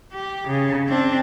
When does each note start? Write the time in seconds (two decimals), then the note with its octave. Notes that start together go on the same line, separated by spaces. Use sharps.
0.13 G4
0.47 C#3
0.88 C4 D4